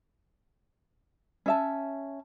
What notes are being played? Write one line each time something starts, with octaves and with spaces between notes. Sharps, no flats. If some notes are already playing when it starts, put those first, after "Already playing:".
C#4 E5 A5